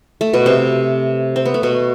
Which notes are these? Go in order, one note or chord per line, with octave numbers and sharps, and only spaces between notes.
A3
B2 B3
C3 C4
C4
B3
A3
B2 B3